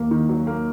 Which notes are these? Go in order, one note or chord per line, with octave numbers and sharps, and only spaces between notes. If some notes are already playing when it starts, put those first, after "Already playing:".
Already playing: D#2 A#3
D#3
F#3
A#3